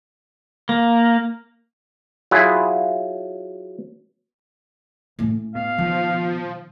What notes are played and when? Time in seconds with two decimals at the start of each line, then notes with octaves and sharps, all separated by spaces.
0.69 A#3
2.31 F#3 E4 F4 G#4
5.19 A2 C#4
5.55 B2 F5
5.78 D#3 F3